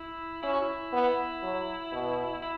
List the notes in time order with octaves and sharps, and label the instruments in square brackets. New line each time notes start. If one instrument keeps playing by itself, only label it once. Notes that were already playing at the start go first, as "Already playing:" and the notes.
Already playing: [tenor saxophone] E4
[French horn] C#4 [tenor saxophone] E4
[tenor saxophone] F#4
E4
[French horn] B3
F#3
B2
[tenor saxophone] E4